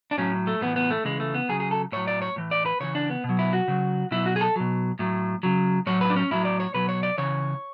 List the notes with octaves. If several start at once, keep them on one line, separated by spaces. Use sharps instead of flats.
D4
A2 F#3 C#4
A3
A2 E3 B3
B3
A3
C#3 E3 G#3
A3
B3
C#3 F#3 G#4
G#4
A4
A2 F#3 C#5
D5
C#5
A2 E3
D5
B4
C#3 E3 C#5
D4
B3
B2
F#3
E4
F#4
C#3 F#3
B2 F#3 E4
F#4
G#4
A4
B2 F#3
A2 F#3
C#3 F#3
A2 F#3 C#5
B4
D4
C#4
A2 F#3 E4
D5
C#5
B2 F#3 B4
C#5
D5
C#3 E3 C#5